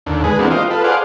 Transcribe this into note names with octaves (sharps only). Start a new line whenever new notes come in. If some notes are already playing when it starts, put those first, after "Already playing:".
D#2 D3
G#3 G#4 B4
E3 A#3 C4 D4 F#4
F4 G4 C5 D#5
F4 A4 B4
G#4 C5 D5 F5 F#5